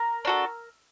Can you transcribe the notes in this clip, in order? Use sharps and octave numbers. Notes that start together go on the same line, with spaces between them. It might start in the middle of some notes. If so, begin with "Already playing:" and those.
Already playing: A#4
D4 F#4 A4